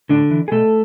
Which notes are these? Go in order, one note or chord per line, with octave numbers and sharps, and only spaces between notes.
A2 D3 D4
E3
G#4
B2 A3 A4